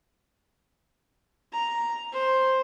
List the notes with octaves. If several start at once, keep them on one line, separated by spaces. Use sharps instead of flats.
A#5
C5